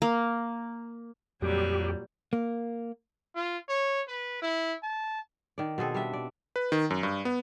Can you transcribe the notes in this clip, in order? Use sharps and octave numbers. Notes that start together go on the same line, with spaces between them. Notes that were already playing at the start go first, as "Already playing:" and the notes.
A#3
F2 A#2 F#3 G3 G4
A#3
F4
C#5
B4
E4
A5
D#3 D5
B2 C4 G#4 A4
G3 D4 E5
D5
B4
D#3
F#2
G2
B3